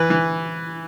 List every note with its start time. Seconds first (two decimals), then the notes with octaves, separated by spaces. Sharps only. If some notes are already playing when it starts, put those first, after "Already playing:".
Already playing: E3 B4
0.10 E3